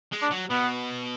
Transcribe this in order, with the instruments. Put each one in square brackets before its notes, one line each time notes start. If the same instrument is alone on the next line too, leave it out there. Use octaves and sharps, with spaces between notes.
[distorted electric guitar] G#3
[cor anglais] D4
[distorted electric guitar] F#3
[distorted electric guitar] B2 [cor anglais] B3